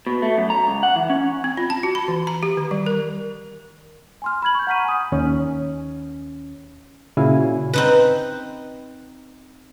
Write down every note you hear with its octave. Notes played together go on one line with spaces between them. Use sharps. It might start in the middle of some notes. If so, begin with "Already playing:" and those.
B2
A3
F#2
A#5
C#2
F#5
E3
C#4
C4
F4
A5
F#4
B5
E3
A#5
G4
D#3
G3
A#4
G#5 C6 F6
B5 F6 G#6 F#7
C#6 G6
F#5 A#5 F6 B6 D#7
G#5 D#6
D#2 C#4
A#2 C#3 E4 F#4 F5 G#5
C4 D#4 B4